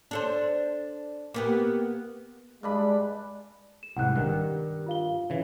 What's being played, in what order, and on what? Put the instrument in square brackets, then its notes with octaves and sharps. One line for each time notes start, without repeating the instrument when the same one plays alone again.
[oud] D4 A4 C5
A#3 B3 G4
[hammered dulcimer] G2 D4 B5 [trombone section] G#3
[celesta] E7
[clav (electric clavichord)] C2 G#2 [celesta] F#5 F#6
[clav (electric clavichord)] G2 D#3
[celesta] F4 F5 G7
[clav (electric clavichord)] C#3 E3